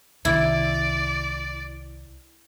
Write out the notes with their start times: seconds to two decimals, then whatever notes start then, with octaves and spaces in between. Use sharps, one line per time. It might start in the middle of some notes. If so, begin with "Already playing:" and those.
0.25 C2 C3 D#3 E4 D5